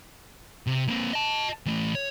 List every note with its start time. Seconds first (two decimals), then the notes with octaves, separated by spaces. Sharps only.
0.67 C3
0.88 A#3 C4
1.13 D#5 A5
1.66 E3 A3
1.95 C#5